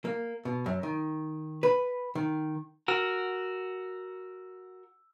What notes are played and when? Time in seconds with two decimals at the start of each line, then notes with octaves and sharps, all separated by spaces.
0.05 A#3
0.45 B2
0.66 F#2
0.83 D#3
1.63 B4
2.15 D#3
2.88 F#4 A#4 E6